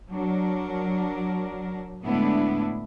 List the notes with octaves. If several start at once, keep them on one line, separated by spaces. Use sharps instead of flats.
F#3 D4 A#4
A2 D3 G#3 B3 D4 E4